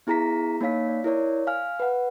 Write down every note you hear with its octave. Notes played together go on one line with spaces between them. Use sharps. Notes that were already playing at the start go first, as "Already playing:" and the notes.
B3 E4 G#4 A#5 A#6 B6
A#3 D#4 C#5 F5 B6
D5
E4 A#4 C#5 D5
F5 G#5 F6
B4 F#5